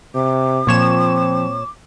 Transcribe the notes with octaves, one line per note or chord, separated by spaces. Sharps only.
C3 D6
A#2 F3 C4 C#5 E7